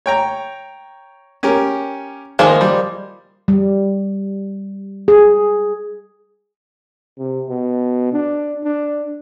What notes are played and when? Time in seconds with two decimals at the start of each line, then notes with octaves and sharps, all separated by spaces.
0.06 C#5 G5 A#5
1.43 C#4 G4 A#4
2.39 D#3 F3 G#3 A#3
2.61 G3
3.48 G3
5.08 G#4
7.19 C3
7.49 B2
8.13 D4
8.64 D4